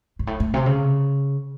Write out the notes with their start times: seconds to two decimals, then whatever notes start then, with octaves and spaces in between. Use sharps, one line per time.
0.19 G#2
0.27 A2
0.40 A2
0.54 C3
0.66 C#3